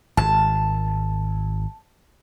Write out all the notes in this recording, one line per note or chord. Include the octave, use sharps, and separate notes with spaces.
G#1 A5